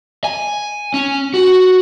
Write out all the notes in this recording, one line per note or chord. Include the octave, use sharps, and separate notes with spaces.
G#5
C#4
F#4